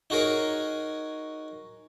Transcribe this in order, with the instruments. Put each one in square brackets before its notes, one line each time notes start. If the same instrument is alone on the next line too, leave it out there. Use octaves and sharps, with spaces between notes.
[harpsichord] D#4 F#4 G#4 A#4 C#5